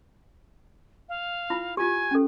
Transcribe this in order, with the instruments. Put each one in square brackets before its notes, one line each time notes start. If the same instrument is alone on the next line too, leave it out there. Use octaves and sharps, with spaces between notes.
[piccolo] F5
[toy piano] E4 F4 B5
[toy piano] F4 G4 [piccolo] G#5
[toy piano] C#4 A4